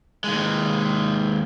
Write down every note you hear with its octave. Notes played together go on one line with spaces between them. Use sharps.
D#2 G#3